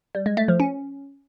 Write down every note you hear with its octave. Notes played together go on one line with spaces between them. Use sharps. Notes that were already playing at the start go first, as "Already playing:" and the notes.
G3
G#3
A3
F3
C#4